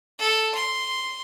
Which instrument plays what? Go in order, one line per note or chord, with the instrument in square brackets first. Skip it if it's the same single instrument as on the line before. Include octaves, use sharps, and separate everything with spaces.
[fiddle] A4
C6